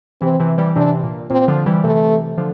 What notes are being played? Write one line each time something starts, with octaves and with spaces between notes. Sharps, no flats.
C3 E3 C4
C3 E3
E3 G3
C3 E3 D4
A#2
A#2 C4
D3 F3
E3 G3
C3 E3 A3
D3 F3